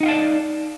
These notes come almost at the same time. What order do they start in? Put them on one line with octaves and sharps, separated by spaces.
D#4 F#5 F5 A5 D5